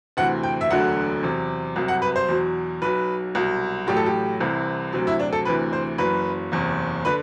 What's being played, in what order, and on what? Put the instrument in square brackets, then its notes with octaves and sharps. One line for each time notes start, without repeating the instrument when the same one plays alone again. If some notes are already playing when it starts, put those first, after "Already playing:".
[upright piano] D2 C3 E3 F#5
G5
E5
E1 D2 D3 F#3 F#5
E2 C3 F#3
C2 C3 F#3
F#5
B4
C5
E2 B2 F#3
B1 B2 F#3 B4
C2 B2 F#3
A1 A2 F#3 G4
A4
G4
C2 C3 E3
D2 C3 F#3
E4
D4
A4
D2 C3 E3 B4
C5
F#1 F#2 E3 B4
F#1 E2 C3
D3 B4